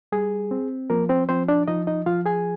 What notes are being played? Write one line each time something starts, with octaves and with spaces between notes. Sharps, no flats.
G3 G#4
C4
F3 A#3 A#4
C4 C5
F3 C4 C5
D4 D5
F3 D#4 D#5
D#4 D#5
F3 F4 F5
G#4 G#5